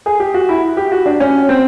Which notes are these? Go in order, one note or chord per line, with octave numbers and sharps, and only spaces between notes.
G#4
G4
F#4
E4
G4
F#4
D4
C#4
C4